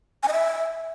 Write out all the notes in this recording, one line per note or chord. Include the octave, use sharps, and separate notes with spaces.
G#5
D#5
E5